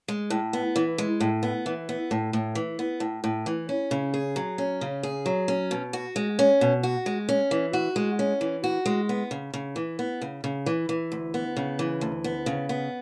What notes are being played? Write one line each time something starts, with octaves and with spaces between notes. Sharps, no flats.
G#3
A2
B3
E3
G#3
A2
B3
E3
B3
A2
A2
E3
B3
A2
A2
E3
C#4
C#3
G#4
F#3
C#4
C#3
G#4
F#3
C#4
B2
F#4
G#3
C#4
B2
F#4
G#3
C#4
E3
F#4
G#3
C#4
E3
F#4
G#3
B3
C#3
C#3
E3
B3
C#3
C#3
E3
E3
D2
B3
C#3
E3
D2
B3
C#3
B3